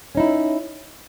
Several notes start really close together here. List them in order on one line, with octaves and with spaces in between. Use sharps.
C#4 D#4 E4